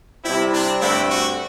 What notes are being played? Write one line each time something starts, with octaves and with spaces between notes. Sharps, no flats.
C3 G3 C4 E4
D4
G2 D3 A3 C4 E4
F#4